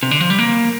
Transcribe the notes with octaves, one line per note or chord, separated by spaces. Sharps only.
C3
D3
F3
G3
A#3